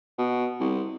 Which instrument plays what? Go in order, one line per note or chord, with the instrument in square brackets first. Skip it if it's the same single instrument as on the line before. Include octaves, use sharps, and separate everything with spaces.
[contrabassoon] B2
C2